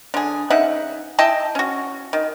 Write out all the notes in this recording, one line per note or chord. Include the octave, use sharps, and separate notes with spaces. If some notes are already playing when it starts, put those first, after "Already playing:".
D3 G#4
C#3 D#4 E5 F#5
E4 D#5 G5 A5
C#4 F#4
D#3